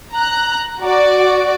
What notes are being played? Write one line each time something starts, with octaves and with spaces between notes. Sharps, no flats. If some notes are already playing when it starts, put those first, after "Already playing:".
A#5 F#6
F#4 D5